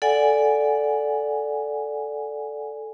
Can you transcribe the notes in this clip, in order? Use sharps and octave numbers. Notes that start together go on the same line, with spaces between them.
A4 D5 F#5 G#5